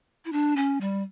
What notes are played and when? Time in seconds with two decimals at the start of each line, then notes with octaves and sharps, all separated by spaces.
0.25 E4
0.32 D4
0.56 C#4
0.81 G3